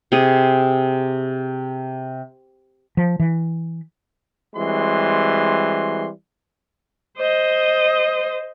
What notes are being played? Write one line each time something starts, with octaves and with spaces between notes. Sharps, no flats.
C3 G#4
F3
E3
E3 G3 G#3 C4 F#4 C6
C5 D#5